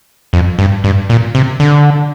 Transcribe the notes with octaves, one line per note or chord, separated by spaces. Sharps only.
F2
G2
G2
A#2
C3
D3